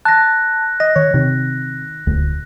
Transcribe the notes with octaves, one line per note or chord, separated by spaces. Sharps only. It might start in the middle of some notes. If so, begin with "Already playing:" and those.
A5 F#6 A#6
D#5 A#6
D#3 C#5
C3 D#3
D#1 D2